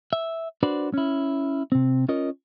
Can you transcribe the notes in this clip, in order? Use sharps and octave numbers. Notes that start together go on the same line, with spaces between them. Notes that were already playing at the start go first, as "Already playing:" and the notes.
E5
D4 F#4 B4 C5 D5
C#4 E4
C3 C4
C#4 F4 A#4 C#5 D#5